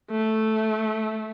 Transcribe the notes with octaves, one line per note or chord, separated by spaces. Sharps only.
A3